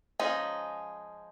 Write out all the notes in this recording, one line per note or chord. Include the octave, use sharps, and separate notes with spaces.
F3 G#3 C#4 D#4